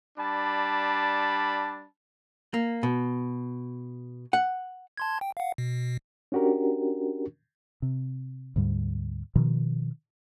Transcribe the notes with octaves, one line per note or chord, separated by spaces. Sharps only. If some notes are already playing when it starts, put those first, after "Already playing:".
G3 D4 A5 B5
A#3
B2
F#5
A5 C6 G#6
G5
F5 F#5
B2
C#4 D4 F#4 G4 A#4
C3
D2 G#2 G3
B2 D#3 F3